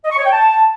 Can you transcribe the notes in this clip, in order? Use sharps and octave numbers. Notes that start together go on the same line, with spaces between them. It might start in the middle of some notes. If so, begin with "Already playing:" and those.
D#5
C#6
C#5
G5
A5